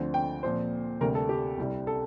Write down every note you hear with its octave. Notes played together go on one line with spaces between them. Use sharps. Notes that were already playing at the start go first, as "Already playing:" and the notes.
Already playing: D2 D3 F3 C4
G5
A#2 F3 C4 C5
D2 C3 G3 A#4
A4
G4
C2 C3 G3
A4